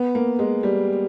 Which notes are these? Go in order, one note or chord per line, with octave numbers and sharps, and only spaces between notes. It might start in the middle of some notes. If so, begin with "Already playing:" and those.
Already playing: B3
A#3
G#3
G3